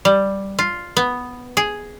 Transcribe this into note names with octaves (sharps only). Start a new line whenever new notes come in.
G3
F4
B3
G#4